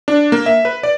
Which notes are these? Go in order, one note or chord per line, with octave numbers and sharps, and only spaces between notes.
D4
A#3
E5
B4
D5